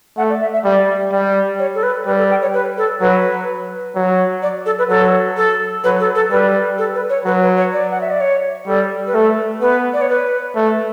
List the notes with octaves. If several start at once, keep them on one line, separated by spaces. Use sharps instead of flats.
A3 F#5
D5
E5
E5
G3 D5
G3
C#5
A4
B4
G3 B4
A4
G5
C#5
B4
A4
F#3 B4
F#3
D5
A4
B4
F#3 A4
A4
F#3 B4
A4
A4
G3 B4
A4
B4
C#5
F#3 B4
B4
C#5
D5
F#5
E5
D5
C#5
G3 A4
B4
A3 A4
B3 B4
D5
C#5
B4
A3